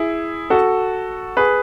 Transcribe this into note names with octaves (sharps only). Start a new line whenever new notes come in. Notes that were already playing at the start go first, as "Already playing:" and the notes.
Already playing: E4 G#4
F#4 A4
G#4 B4